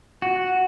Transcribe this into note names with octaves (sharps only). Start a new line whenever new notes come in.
F#4